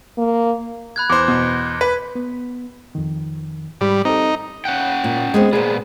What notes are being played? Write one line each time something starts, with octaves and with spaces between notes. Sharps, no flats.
A#3
B5 F#6 G#6
E2 C5 D6
B2
B4 B6
B3
F2 D#3
G#2 G3 G4 B5
C4 D#4 A4
C#4 F#5 G5
A#2
G#3 B3 C4
A#2 B3 G#4 C5